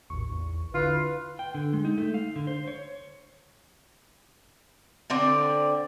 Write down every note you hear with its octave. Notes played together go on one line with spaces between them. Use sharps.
A1 D#2 C#6
E2
D3 E4 F4 B4
G5
D3
G#3
D#4
A3
F5
D3
C5
C#5
D3 C4 D5